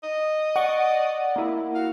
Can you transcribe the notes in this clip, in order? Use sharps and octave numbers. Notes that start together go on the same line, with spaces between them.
D#5
D5 F#5 C#6
A#3 E4
F#4 F5